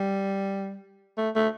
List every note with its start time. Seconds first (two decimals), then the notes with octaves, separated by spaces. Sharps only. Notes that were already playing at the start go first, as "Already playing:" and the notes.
Already playing: G3
1.18 A3
1.35 A3